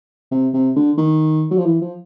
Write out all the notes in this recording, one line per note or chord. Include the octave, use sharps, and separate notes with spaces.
C3
C3
D3
D#3
F#3
F3
E3
F3